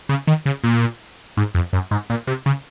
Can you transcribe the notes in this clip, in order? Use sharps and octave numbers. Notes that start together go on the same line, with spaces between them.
C#3
D#3
C#3
A#2
G#2
F2
F#2
G#2
A#2
C3
C#3